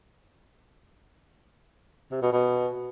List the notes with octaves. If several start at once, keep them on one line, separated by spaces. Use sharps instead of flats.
C3
B2
B2